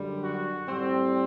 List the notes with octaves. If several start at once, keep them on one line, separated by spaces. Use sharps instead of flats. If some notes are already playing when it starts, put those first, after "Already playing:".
Already playing: F#2 D3 G3
F#4
A2 G3 C4